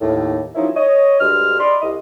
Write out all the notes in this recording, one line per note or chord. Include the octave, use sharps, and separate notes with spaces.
D#2 A2
D#3 F3 F#3 C#4 D#4 E4
C#5 D#5
D2 G2 G#3 F#4 F6
D5 D#5 B5 C6
C2 D#5